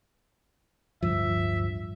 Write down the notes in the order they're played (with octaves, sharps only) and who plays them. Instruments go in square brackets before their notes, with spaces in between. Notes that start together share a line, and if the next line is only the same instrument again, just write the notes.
[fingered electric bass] D1 G2 F3 [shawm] E5